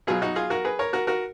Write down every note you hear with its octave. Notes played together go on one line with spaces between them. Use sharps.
B2 F#3 F4 G#4
D#4 F#4
F4 G#4
F#4 A#4
G#4 B4
A#4 C#5
F#4 A#4
F#4 A#4